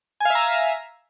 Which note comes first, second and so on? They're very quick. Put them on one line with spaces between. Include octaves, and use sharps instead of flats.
G#5 F5 E5 A#5